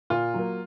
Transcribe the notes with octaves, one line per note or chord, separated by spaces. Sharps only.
A#2 F4
F#3 A#3